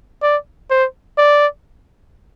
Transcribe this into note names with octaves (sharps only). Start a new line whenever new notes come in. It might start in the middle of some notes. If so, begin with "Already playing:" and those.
D5
C5
D5